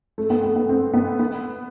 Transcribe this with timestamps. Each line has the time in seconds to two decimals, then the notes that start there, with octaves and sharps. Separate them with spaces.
0.18 A3
0.30 B3
0.43 A3
0.56 B3
0.69 A3 C4
0.94 B3
1.19 B3